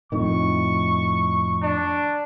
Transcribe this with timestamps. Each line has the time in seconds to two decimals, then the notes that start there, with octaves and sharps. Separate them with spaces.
0.12 F2 A2 D#3 C#6
1.63 D4